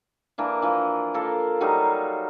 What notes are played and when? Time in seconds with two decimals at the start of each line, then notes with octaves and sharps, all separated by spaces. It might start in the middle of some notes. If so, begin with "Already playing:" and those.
0.38 E3 A#3 D4
0.62 E3 F3 A#3
1.14 A#3 F4 A4
1.61 F#3 G3 D#4 F4